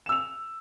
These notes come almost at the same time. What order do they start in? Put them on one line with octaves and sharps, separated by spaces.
E7 E6 F7